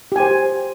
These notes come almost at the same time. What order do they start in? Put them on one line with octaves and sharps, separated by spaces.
G4 G#5 C5